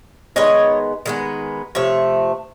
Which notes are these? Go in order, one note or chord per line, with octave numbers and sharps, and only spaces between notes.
D#3 G#3 B3 C#5 D#5
D#3 G#3 B3
C3 F3 A3 C#5